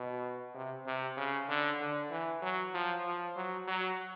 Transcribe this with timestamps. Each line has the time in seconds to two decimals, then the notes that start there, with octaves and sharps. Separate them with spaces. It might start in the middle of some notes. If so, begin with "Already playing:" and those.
Already playing: B2
0.55 C3
0.86 C3
1.17 C#3
1.49 D3
1.80 D3
2.11 E3
2.42 F#3
2.74 F3
3.05 F3
3.36 F#3
3.67 F#3